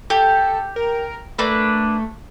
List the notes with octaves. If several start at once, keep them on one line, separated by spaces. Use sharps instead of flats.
G4 A4
A#4
A3 A#3 D4 B4